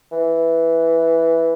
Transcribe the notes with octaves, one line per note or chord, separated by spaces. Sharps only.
E3